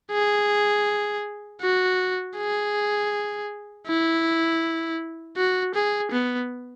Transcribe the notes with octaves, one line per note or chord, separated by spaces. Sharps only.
G#4
F#4
G#4
E4
F#4
G#4
B3